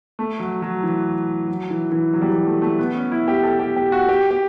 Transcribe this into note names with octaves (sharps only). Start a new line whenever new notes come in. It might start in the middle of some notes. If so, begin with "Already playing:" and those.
A3
F#3
F#3
E3
F#3
E3
E3
F#3
G3
F#3
A3
A3
B3
C#4
E4
G4
A4
G4
G4
F#4
G4
G4